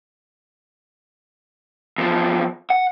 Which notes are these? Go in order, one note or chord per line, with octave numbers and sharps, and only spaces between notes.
E2 F3
F#5